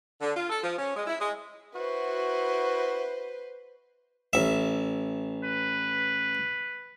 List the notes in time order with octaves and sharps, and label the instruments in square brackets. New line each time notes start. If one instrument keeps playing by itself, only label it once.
[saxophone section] D3
F4
A4
F3
C#4
G#3
E4
G#3
[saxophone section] E4 F#4 [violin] B4 C5
[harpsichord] A1 E5
[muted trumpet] B4